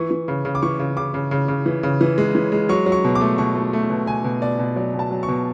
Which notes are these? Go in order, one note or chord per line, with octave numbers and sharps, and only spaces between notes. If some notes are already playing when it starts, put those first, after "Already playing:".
Already playing: E3 C#6
E3
C#3
C#3
D6
E3 C#6
C#3
C#3 D6
C#3
C#3
C#3
E3
C#3
E3
G#3
E3
G#3
F#3 C#6
F#3
C#6
B2
D6
A3
B2 C#6
A3
A3
B2
B2 G#5
B2
B2 D5
B2
F#3 D5
B2
A5
F#3
C#6
B2